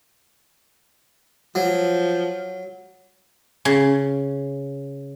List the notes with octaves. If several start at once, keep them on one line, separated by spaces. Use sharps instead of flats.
F3 F#3
C#3